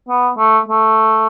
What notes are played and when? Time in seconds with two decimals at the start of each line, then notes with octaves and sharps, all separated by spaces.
0.09 B3
0.38 A3
0.68 A3